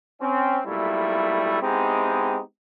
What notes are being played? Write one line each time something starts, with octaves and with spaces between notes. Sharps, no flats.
C4 C#4
B1 A#2 G3 A3 E4
G#3 B3 C4 D#4 E4 G4